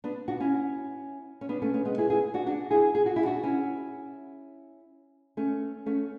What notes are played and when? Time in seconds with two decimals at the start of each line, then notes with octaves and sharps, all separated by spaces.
0.04 B3 D4
0.28 D4 F#4
0.40 C#4 E4
1.41 C#4
1.49 B3 D4
1.62 A3 C#4
1.74 A3 C#4
1.85 G#3 B3
1.98 E4 G#4
2.10 E4 G#4
2.34 D4 F#4
2.46 D4 F#4
2.71 E4 G#4
2.95 G#4
3.06 F#4
3.16 E4
3.25 D4 F#4
3.43 C#4 E4
5.37 A3 C#4
5.86 A3 C#4